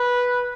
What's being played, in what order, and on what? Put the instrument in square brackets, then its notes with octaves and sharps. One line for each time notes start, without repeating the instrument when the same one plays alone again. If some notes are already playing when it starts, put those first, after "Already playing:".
Already playing: [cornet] B4